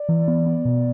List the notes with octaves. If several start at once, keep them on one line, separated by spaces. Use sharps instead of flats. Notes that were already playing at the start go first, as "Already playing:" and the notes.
Already playing: D5
E3
B3
B3
B2